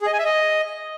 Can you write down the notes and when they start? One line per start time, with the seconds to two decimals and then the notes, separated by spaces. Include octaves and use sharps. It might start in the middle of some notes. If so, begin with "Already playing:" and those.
0.01 G#4
0.07 D#5
0.13 G#5
0.19 E5
0.25 D#5